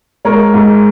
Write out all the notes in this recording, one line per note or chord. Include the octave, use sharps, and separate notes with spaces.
G#3 A#4 C#5
G#2